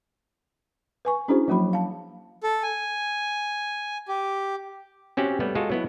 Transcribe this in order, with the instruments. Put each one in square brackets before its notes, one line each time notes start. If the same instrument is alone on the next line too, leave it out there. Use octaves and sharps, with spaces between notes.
[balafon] B4 G#5 C#6
C#4 D4 E4 F#4 G#4 C5
F3 F#3 A#3 F#4 B5
F5 A5
[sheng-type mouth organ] A4
G#5
G4
[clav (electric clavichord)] C4 C#4 F#4 G4 E5 F#5
G3 A3 B3
G#3 F4 F#4 A4
F#3 B3 E4